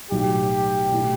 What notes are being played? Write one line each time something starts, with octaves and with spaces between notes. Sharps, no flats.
B1 A2 F#3 G4
B2 A3 E4